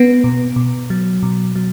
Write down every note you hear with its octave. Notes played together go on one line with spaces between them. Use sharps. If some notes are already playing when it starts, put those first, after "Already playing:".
Already playing: B3
B2
B2
F#3
B2
F#3